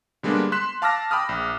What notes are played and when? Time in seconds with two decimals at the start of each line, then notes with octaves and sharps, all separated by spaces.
0.23 D3 G3 G#3 A#3 B3 D4
0.52 C6 F#6 B6 E7
0.82 F5 A5 D6 E6 F6 A#6
1.11 G5 B5 D6 D#6 F6
1.29 A#1